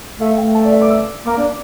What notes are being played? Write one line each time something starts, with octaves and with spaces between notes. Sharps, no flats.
A3 F5
A3 G5
A5
D5
E5
D6
E6
A#3 D6
D4